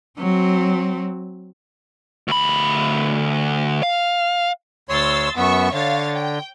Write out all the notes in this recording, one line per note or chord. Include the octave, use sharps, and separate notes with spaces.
F#3 C4
D2 B5
F5
D2 C#5 C6 E6 A6
F#2 B3 E5 C#6
D3 C#5 F5 A6
G5